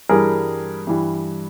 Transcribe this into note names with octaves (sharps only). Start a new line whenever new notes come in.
G2 E3 G3 G#4 A#4
G2 E3 G3